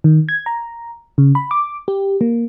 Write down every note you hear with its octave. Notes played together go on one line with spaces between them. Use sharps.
D#3
G#6
A#5
C#3
B5
D6
G4
A#3